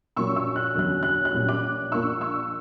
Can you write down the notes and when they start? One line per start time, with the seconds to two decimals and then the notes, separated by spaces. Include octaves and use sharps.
0.16 A#1 A#2 F#3 A#3 C#4 C#6 E6
0.36 C#6 E6
0.56 F#6
0.75 E2 D3 F#3 C#4 F#6
1.03 F#6
1.25 F#6
1.33 A#1 A#2 G3 C#4
1.48 D6 F#6
1.92 A#1 A#2 A#3 D4 C#6 E6
2.21 C#6 E6